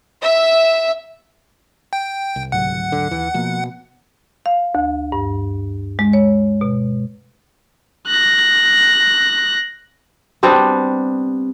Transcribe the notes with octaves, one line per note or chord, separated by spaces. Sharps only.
E5
G5
C2
D2 G#2 F#3 F#5
D3
D#2 E3
B2 F3 A#3
F5
D2
G2
G#3
C#5
B2
F#6 A#6
G3 B3 C4 D4